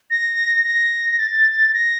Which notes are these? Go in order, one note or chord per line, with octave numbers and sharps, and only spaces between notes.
A#6
A#6
A6
A#6